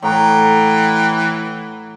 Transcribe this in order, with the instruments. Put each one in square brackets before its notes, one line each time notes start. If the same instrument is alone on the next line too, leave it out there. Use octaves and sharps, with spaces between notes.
[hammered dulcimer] A2 F#5 A#5 [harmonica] E3 G5